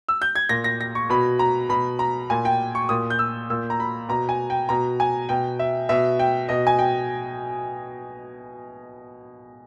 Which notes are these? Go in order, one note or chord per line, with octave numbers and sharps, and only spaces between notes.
E6
G6
G#6
A#2 A#6
A#6
A#6
C#6
B2 B5
A#5
B2 B5
A#5
A#2 G#5
G5
C#6
A#2 D#6
G6
E6
A#2 E6
A#5
B5
B2 A#5
G#5
G5
B2 A#5
G#5
B2 G5
E5
B2 E5
G5
B2 D#5
G#5
G5